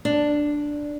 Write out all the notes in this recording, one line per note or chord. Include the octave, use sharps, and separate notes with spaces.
D4